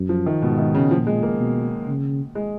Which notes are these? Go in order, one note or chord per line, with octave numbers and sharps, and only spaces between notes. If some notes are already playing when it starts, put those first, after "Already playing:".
Already playing: F#2
F3
D#3
G#2 B2
D#3
C#3
A#2 F3
G#3
A#3
B2
C#3
G#3